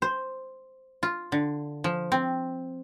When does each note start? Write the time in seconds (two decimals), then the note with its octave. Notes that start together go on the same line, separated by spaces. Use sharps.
0.02 C5
1.03 F4
1.32 D3
1.84 F3
2.12 C4